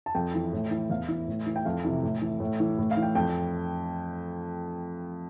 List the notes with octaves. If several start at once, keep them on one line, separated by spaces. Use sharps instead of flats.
A5
F2 G5
E3
A2
E3
E2 F5
E3
A2
E3
G5
F2 F5
C3 E3
A2
E3
A2
E3
A2
F5
E3
G5
F2 G5